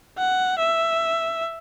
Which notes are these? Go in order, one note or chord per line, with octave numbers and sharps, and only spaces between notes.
F#5
E5